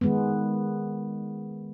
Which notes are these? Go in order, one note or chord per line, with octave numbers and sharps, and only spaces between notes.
D#3 G#3 B3